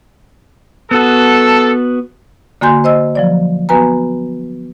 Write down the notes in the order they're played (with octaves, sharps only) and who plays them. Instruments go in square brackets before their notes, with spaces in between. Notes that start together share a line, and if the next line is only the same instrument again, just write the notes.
[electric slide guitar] B3 F#4 [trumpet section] A4
[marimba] D3 A#3 F#4 G#5 C6 G6
C5 D#5 E6
F3 F#3 D5
B3 F#4 B4 G#5 A#5